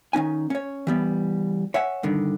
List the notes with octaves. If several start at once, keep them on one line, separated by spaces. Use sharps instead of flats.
D#3 C#4 D#4 G#5
C#4 C#5
E3 G3 B3
C#5 E5 F#5 G#5
G2 D3 D#3